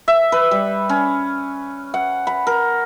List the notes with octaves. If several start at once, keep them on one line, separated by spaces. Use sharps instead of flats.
E5
B4
G3
C#4
F#5
B5
A#4